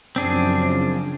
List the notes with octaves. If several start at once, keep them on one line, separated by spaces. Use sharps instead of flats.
F#2 C#3 F3 C4 D4 G#4